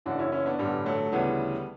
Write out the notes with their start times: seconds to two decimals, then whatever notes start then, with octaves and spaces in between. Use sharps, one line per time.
0.06 F#1 F#2 C#3 E3 D4 F#4
0.19 C#4 E4
0.32 C#4 E4
0.46 B3 D4
0.59 A1 G2 D3 G3 B3
0.86 F#3 A3
1.12 D2 C#3 E3 G3 B3